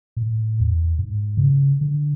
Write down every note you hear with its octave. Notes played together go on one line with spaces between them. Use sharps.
A2
E2
G#2
C#3
D3